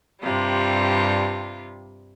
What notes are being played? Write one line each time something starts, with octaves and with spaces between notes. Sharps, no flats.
G2 C3 G3 F4